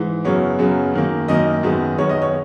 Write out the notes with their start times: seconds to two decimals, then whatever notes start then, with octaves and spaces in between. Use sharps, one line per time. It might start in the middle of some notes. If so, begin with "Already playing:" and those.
Already playing: G#2 E3
0.25 F#2 C#3 F#3 B3 C#5
0.59 F#2 C#3 F#3 B3
0.94 F#2 D#3 A#3
1.28 F#2 D#3 A#3 D#5
1.63 F#2 D#3 G#3 B3
1.98 F#2 D#3 G#3 B3 C#5
2.09 D#5
2.22 C#5